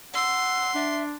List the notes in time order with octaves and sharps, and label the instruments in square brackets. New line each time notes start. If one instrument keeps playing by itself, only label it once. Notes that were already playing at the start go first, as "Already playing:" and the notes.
[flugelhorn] F#5 [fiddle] C6 [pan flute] E6
[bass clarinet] D4 [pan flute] E5